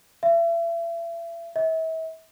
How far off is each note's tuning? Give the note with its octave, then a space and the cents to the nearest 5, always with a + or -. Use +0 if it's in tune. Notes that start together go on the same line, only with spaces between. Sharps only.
E5 +35
E5 -40